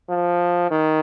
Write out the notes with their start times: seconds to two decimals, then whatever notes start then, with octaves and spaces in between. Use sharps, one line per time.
0.09 F3
0.71 D#3